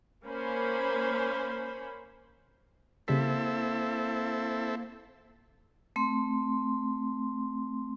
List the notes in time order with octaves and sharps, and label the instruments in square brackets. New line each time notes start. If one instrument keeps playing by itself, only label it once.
[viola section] A#3 C#4 C5 B5
[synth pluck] C#3 G3 B6 [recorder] A#3 [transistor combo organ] C4 E4 A4
[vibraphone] A3 C4 C6